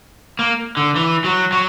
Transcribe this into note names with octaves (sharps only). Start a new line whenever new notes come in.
A#3
D3
E3
F#3
F#3